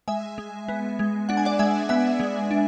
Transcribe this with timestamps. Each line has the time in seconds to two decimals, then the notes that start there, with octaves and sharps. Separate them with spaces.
0.08 G#3 E5 G#5
0.38 G#3
0.68 B3
0.99 G#3
1.29 D4 F#5
1.37 G#5
1.45 D5 F#5
1.59 G#3 E5 G#5
1.89 B3 E5 G#5
2.20 G#3
2.51 D4